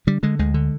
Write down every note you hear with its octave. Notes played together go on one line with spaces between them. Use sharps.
D3 G3
D3 G#3
D2 G#3
D3